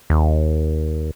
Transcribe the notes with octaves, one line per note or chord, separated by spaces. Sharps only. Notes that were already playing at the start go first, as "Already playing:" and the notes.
D#2